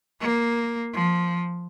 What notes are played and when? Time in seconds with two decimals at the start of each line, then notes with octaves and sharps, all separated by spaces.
0.20 A#3
0.93 F3